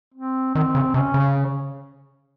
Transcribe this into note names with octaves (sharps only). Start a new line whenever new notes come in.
C4
D#3 C4
C#3
C3 C#4
C#3